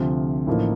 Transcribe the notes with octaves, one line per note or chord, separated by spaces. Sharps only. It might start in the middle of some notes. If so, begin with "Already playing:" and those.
Already playing: D2 C3 F3
A1 A2 F3 A#3 D#4